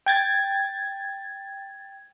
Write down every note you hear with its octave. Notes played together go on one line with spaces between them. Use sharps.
G5 G#6 A6